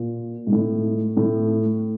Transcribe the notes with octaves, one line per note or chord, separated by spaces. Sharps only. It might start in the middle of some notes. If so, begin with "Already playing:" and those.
Already playing: A#2
G#2
A2
A2